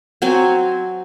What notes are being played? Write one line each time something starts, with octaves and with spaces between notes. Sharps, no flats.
F#3 C4 G#5